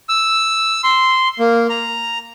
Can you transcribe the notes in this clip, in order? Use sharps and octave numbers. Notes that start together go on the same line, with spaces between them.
E6
C6
A#3
A#5